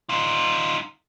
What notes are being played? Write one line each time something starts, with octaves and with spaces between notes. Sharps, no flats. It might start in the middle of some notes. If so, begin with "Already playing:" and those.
D#4 F4